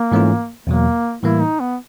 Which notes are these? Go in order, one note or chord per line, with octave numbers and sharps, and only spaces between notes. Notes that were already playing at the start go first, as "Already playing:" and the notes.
Already playing: A#3
G#2 E3 A3 C#4 F4
E2 B2 F#3 A#3
A2 E3 G3 A#3 E4
D#4
B3